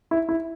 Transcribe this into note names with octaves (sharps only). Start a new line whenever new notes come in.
E4
E4